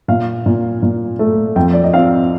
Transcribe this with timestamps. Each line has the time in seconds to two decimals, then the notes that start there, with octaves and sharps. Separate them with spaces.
0.08 A#2 F5
0.46 A#2
0.82 A#2
1.19 A3
1.56 F2 G5
1.73 D5
1.84 D#5
1.93 C4 F5